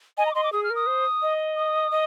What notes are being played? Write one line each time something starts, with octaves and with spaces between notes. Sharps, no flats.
D#5 G#5
A#5
D6
D#5 C6
D6
G#4 D#6
F6
A#4
D#6
C5
D#5
D#6
D#5